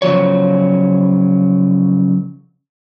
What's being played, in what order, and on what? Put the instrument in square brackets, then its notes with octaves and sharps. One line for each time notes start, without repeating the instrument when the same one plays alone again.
[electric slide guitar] C#3 F3 F#3 C#5